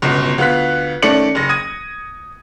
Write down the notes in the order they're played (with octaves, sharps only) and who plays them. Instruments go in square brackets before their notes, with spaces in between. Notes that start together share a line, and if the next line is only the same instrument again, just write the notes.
[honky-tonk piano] G1 C#2 B2
D2 B3 F4 F#6 B6
D#3 A3 C#4 D5 C#7 F#7
F#1 A#6
D#6 G#6 D#7